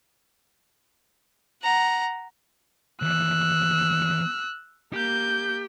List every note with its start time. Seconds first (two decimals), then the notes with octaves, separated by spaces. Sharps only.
1.62 F#5 A#5
3.02 D#2 E3 E6 F#6
4.93 A#3 G4 G6